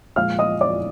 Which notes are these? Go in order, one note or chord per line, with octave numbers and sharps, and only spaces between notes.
A#2 F3 G#3 F5 F6
D#5 D#6
D5 D6